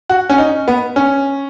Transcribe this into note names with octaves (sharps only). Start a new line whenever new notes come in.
F#4
C#4
D#4
B3
C#4